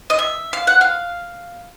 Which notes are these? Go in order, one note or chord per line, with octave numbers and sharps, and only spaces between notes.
D#5
E5
F5
F#5
F5